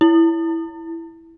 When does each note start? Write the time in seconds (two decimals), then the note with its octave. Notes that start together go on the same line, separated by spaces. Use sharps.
0.01 E4